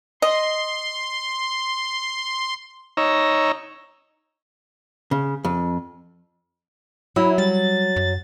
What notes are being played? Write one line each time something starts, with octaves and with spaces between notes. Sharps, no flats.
D#5 C6
D#4 C#5 A#5 E6
C#3
F2
F#3 E4
G3 A6
F#2